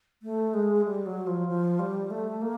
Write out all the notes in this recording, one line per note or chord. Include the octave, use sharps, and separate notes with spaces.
A3
G#3
G3
F#3
F3
F3
G3
A3
A#3